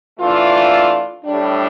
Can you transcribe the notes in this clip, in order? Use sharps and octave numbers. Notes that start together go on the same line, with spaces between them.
E3 A3 D4 F4
A2 G3 D4